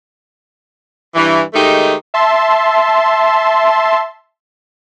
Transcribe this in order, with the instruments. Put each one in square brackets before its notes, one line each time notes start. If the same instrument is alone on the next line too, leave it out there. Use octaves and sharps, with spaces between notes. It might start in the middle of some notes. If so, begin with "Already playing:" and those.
[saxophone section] G2 E3
D#3 G#3 A3 D#4 G4
[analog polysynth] E5 A5 C6